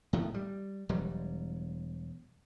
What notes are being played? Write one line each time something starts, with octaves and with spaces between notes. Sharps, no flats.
A2 D#3 A3
G3
E1 F#3 G3